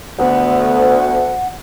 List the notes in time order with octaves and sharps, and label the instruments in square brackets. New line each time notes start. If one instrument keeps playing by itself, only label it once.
[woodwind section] D2 [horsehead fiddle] B3 [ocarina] F#5